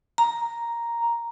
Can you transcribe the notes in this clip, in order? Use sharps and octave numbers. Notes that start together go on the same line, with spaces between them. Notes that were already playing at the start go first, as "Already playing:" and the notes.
A#5